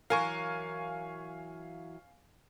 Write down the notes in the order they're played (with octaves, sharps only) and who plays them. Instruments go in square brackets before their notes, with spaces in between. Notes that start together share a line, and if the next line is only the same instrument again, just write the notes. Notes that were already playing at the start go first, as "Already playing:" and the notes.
[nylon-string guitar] E3 F#3 A#4 [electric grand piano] F5 G#5 C#6